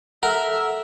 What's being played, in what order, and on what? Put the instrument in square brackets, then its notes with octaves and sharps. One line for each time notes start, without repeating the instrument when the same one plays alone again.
[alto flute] A4 [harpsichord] A#4 [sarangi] E5 [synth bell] F#5